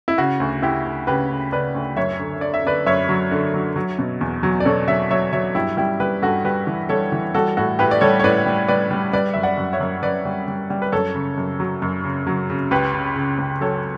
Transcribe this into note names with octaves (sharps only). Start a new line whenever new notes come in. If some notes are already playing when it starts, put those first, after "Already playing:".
E4
C#3 F#4
D2
D2 E4 G4
D2
C#3 G4 B4
D2
C#3 B4 D5
D2
F#2 C#5 E5
D3
D3 D5
E5
D3 B4 D5
F#2 C#5 E5
F#3
D3
F#3
F#3
B2
E2
F#3
D5
B2 A4 C#5
F#3 C#5 E5
F#3 C#5 E5
F#3 C#5 E5
G2 E4 G4
G3 E4 G4
G3 G4 B4
G2 F#4 A4
G3 G4 B4
E3
G3 A4 C#5
E3
G3 F#4 A4
A2 F#4 A4
A2 G4 B4
D5
G3 A4 C#5
C#5
A2 B4 D5
G3
G3 B4 D5
G3
G3 B4 D5
F#2 E5
D5 F#5
F#2
C#5 E5
F#2
F#2 B4 D5
G3
G3
G3
B4
F#2 A4 C#5
C#3
F#2
F#3
F#2
C#3
F#3
C#3
C#2 G4 B4
C#3
C#3
C#2
F#3 A4 C#5